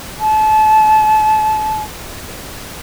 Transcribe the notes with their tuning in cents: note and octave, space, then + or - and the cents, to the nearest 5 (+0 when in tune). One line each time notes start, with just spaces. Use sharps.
A5 -30